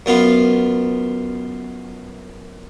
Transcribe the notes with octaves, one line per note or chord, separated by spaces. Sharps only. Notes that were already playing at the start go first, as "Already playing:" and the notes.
F#2 B3 F4